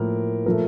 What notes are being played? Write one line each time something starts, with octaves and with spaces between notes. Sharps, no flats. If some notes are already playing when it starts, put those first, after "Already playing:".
Already playing: A2 F3 A#3 A#4
A#2 F3 A3 A#4